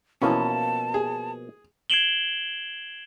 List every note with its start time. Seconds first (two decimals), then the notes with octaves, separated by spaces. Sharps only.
0.22 B2 E3 F3 A#3 C#4 A5
0.94 G#4
1.90 G#6 C7 D7 E7 F#7 G7